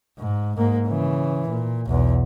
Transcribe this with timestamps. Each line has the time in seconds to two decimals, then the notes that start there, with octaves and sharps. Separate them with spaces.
0.18 G#2
0.57 G#2 A#3
0.87 C#3 E3
1.48 A#2
1.87 B1 E2